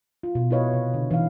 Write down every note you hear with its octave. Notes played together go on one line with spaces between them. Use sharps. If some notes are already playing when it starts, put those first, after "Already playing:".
F4
B2
E4 F#4 B4 C#5 D#5 F5
C3
D3
E3 D#4 F5